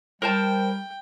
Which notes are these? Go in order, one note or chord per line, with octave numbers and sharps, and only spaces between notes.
G3 A#4 C5 G5 A5